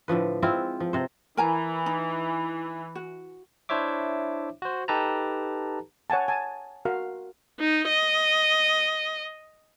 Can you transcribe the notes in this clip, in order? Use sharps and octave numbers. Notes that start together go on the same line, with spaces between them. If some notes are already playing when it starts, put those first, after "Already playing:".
A2 D3 F3 B4
G#3 C4 E4 F4
F3
C3 C5
E3 A#4 G#5 A#5
D#4
F#4
D4 E4 C5 C#5 E5 D6
F#4 C5
D#4 G4 A4 B4 A5 A#5
C#5 F#5 G#5 A5
G#5 A5
F#4 A#4 F5
D#4
D#5